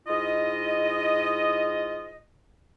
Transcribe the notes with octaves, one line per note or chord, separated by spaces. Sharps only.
G#2 E4 F4 D#5